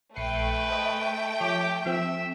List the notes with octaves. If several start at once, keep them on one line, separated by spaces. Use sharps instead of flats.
A#1 A3 B4 G5 C7 C#7
C5 D#5
F3 G4 C#5
F3 C4 E5